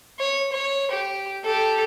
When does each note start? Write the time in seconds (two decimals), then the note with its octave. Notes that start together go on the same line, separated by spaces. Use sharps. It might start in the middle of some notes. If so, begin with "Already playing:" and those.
0.19 C#5
0.52 C#5
0.91 G4
1.44 G4 A4